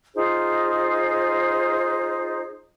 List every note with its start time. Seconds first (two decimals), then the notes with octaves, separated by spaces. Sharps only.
0.15 D#4 F4 G#4 C5